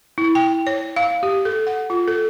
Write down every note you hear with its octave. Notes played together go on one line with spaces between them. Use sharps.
E4
G5
C#5
F5
G4
A4
F#5
F4
A4